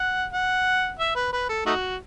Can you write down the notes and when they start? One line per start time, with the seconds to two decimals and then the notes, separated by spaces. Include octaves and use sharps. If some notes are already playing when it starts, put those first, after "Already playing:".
Already playing: F#5
0.32 F#5
0.99 E5
1.15 B4
1.33 B4
1.49 A4
1.66 A3 D#4 F#4